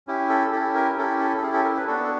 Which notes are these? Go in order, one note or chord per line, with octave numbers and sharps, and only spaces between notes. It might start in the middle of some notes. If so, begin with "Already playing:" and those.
C#4 E4 G4
A4
C#4 E4 G4 A4
A#4
C#4 E4 G4 A4
A4
A4
C#4 E4 G4 G#4
A4
A#4
B4
B3 D4 F#4 A4
A4